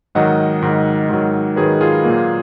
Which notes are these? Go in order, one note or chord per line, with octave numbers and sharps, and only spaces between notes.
G#2 D#3 F#3 D#5 F#5
G#2 D#3 F#3
G#2 D#3 F#3
G#2 D#3 F#3 G#4 B4
F4 G#4
A#2 F#3 A#3